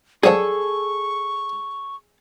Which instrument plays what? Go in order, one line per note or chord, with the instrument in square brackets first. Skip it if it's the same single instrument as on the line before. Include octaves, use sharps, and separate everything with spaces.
[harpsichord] F#2 F3 G3 [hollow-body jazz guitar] G#4 A4 [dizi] C#6